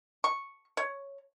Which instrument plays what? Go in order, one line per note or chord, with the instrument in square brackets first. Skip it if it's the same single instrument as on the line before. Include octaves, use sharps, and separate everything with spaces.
[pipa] C#6
C#5